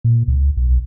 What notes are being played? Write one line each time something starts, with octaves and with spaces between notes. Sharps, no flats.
A#2
C#2
B1